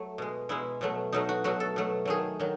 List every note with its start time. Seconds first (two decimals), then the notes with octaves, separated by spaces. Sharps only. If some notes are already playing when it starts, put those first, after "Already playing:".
Already playing: F#3 A3
0.18 B2 G#3
0.49 B2 G#3 E4
0.81 B2 F#3 A3
1.13 B2 F#3 A3 D#4
1.29 F#4
1.44 B2 F#3 A3 F#4
1.60 A4
1.76 B2 F#3 A3
2.05 D#3 F#3 A3 G#4
2.40 D#3 F#3